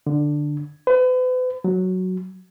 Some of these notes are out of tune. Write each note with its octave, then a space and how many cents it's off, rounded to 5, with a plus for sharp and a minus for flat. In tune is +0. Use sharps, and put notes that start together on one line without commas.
D3 +10
B4 +40
F#3 +0